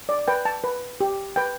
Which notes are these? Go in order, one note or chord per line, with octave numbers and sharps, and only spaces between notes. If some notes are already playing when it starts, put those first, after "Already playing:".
D5
B4 G5
A5
B4
G4
B4 G5